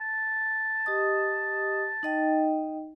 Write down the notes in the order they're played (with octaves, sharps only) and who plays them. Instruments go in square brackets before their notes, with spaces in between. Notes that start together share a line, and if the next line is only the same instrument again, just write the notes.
[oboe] A5
[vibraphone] G4 D#5 D#6
D#4 D#5 G5